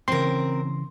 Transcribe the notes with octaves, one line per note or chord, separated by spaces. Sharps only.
C#3 E3 C4 A#4 C6